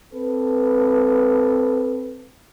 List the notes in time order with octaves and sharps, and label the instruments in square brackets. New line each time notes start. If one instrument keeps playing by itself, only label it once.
[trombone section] C4 A4 B4